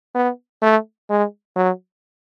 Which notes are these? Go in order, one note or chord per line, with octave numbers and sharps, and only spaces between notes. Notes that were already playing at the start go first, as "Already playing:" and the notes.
B3
A3
G#3
F#3